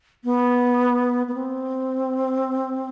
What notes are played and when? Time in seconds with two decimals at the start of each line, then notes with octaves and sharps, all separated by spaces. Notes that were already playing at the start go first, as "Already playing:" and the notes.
0.24 B3
1.28 B3
1.34 C4